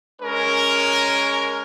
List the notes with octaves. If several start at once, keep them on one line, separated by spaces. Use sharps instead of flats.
G#3 C#4 A#4